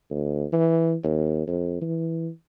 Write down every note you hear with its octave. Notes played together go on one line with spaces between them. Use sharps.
D2
E3
D#2
F2
E3